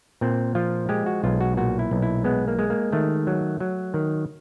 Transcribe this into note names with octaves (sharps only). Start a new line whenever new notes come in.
A#2 C4
F3 F4
G#3 G4
F#4
B1 F4
F#4
A#2 F#4
E4
B1
E4
G#3 B3
A#3
G#3
A#3
D#3 A3
F#3
F#3
D#3